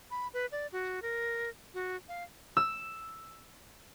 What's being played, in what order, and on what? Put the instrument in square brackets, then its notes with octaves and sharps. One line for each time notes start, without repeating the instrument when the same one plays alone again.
[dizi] B5
B4
D5
F#4
A#4
F#4
F5
[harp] E6